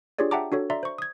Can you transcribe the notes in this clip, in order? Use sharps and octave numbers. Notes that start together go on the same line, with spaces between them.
D4 F4 G4 G#4 C#5 D5
E5 F#5 G5 A5 A#5 D6
D4 F#4 A4 C#5
D5 E5 A#5 C6
C5 C#6
D#6 G#6